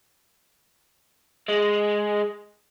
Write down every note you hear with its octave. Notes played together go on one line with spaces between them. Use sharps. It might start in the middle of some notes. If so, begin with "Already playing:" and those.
G#3